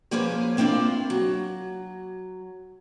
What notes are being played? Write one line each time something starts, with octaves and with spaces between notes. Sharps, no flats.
F3 A#3 C#4 G#4 B4 C5
A#3 C4 D4 E4 F4
F#3